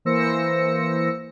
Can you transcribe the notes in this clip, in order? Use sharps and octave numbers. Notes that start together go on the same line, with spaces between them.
E3 A#3 C5 E6 A#6 C#7